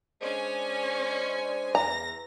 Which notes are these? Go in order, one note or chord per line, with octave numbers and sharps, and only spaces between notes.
G#3 C#4 D4 C5 G#5
E2 A#5 A#6